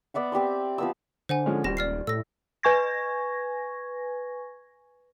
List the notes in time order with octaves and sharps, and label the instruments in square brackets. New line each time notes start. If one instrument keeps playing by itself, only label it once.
[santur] B3 D5 E5 F#5
C4 G4 D5 C6
F3 B3 E6
[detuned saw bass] D3 [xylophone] C5 F#5 G#5
[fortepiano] F3 G#3 C#4
[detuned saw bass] D#1 [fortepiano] C#2 G3 [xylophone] G4 A#6
[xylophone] D5 F6 C7
[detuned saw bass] A2 [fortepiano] A3 [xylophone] E6 A#6
[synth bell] B4 G#5 C#6 G#6 A#6